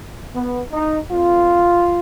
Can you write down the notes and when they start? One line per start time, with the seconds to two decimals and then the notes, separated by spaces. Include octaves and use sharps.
0.34 B3
0.72 D#4
1.09 F2 F3 F4